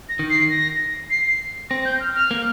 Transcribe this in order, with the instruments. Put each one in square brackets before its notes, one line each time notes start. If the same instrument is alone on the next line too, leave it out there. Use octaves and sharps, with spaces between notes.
[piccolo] A#6
[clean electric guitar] D#3
[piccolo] C7
A#6
C7
[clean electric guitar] C4 [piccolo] A#6
[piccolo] G6
F6
F6
[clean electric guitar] A#3